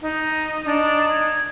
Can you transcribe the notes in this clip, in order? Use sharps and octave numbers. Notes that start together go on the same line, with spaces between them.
D#4
D4 D#4
G#6